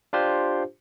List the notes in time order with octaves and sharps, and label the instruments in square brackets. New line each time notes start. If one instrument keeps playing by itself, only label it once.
[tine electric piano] D4 F4 G4 C5